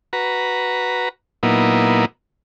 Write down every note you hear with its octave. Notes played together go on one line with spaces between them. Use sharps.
F#4 B4 A#5
A#2 F#3 A#3 B3 D#4 E4